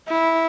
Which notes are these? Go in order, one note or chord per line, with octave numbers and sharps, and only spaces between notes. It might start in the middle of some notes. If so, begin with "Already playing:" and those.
E4